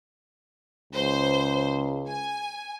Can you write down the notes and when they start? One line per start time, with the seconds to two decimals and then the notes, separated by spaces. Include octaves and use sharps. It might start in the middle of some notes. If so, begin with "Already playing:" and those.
0.93 C#2 C5
2.07 G#5